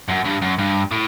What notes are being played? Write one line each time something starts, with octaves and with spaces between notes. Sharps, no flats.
F#2
G2
F#2
G2
A2